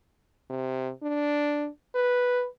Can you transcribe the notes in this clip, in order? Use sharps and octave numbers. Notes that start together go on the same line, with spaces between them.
C3
D4
B4